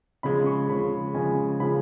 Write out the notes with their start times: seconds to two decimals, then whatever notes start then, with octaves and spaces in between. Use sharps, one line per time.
0.23 C#3 F3 G#3 B5
0.46 C#6
0.69 C#3 F3 G#3 B5
1.14 C#3 F3 G#3 G#5
1.60 C#3 F3 G#3 B5